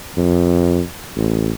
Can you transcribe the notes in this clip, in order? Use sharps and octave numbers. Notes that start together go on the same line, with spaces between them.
F2
A1